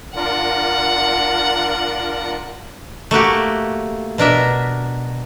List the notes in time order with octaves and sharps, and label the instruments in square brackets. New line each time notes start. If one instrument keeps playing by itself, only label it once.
[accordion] D4 F4 A#4 [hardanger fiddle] F#5
[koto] A3 A#3 F#4 G4
B2 D4 A#4 E5